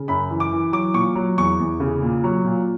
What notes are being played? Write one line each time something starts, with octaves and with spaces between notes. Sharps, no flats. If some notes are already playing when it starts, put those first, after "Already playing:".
Already playing: C#3
F#2 B5
E3
D6
E3
F#3 D6
A#2 C#6
F#3
E2 C#6
E2
C#3
A#2
F#3
A#2